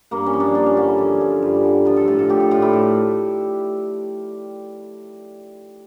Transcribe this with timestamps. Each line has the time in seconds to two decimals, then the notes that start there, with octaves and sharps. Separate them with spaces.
0.11 G2 A#3
0.26 C#4
0.33 F3
0.40 D4
0.55 G2 D4
0.66 C#4
0.77 D3 C#4
0.88 E4
0.98 F3
1.21 F3
1.42 G2
1.64 D3
1.85 F3 F4
1.97 A4
2.08 A2 F4
2.19 A4
2.29 A2 G4
2.40 F4
2.51 A2 F4
2.62 E4
2.73 A2